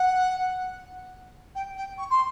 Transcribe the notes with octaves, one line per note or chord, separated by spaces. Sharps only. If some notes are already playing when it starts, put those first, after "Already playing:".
Already playing: F#5
G5
G5
C#6
C6